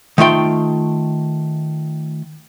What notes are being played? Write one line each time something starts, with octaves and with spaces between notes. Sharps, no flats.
D#3 A3 F4 G5